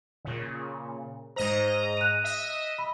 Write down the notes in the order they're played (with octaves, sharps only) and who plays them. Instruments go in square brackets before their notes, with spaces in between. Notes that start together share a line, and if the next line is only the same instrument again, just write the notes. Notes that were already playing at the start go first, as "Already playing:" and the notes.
[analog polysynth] A#2 C#3
[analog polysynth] G#2 D#5 A#5 [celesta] C5
[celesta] F#6 D#7
[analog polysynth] D#5 E5
[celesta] B5